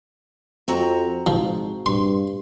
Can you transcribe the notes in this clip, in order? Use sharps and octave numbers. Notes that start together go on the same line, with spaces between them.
F2 C4 F#4 A#5
G#2 F3
G2 C6